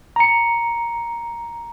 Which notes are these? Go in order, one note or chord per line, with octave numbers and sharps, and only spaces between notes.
A#5 C#7